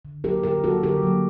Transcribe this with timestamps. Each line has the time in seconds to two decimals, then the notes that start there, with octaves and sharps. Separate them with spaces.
0.05 D3
0.24 F#3 A#3 G4 A#4
0.43 D3 G4 A#4
0.64 F#3 A#3 F#4 A4
0.83 D3 G4 A#4
1.03 F#3 A#3